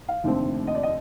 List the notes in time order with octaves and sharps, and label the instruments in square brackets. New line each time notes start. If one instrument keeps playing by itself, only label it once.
[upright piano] F5
F1 D#2 D3 A3 C4
D#5
D5
D#5